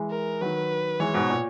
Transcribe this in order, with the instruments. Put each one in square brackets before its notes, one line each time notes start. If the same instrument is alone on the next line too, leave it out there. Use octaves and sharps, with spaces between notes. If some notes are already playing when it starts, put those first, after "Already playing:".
Already playing: [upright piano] E3 G#3
[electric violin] A#4
[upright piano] D#3 F#3 [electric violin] B4
[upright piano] E3 G#3 [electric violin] C#5
[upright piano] G#2 B2
A#2